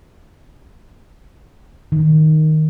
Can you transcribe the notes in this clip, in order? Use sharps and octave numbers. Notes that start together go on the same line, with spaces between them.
D#3